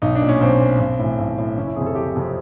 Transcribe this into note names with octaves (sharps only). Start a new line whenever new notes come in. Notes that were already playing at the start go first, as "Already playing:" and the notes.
B1 D#4
D4
A#2
C#4
B1 C4
A#2
B1
A2 E3
B1
A2 E3
F#1 C#4
E4
F2 C3 G#4
A4
F#1 G4
F2 C3